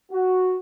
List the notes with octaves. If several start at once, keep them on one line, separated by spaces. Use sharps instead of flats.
F#4